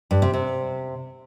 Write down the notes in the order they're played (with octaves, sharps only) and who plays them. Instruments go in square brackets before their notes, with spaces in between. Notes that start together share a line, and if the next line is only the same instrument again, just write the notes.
[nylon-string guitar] G2
C3
C3